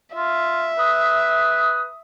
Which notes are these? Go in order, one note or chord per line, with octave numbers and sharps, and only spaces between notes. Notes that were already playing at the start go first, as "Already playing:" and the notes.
F4 E5
B4 D#6